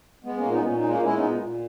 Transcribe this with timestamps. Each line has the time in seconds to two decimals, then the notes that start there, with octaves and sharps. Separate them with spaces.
0.24 G#3 B3
0.38 A#3 C#4
0.44 A#2
0.50 B3 D#4
0.64 A#2 C#4
0.76 D#4
0.83 G#3
0.88 A#3 C#4
1.03 G#3 C#4 E4
1.16 B3 D#4
1.22 A#2
1.42 A#2